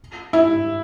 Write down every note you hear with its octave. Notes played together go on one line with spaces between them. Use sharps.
E4